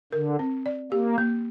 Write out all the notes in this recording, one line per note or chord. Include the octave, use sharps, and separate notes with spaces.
D3 A#4
C4
D5
A#3 G4
A#3